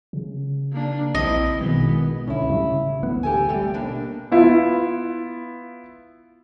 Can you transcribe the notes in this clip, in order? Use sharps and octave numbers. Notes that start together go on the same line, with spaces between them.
C#3
A#3 D4
A#1 C4 E4 D#5
B2 D#3 G#3 B3
C#2 D3 C#4 E4 C#5
A2 C#3 G3
A1 D2 B3
G4 A4 G#5
G3 A3 G4
B2 A#3 D4
B3 E4 F4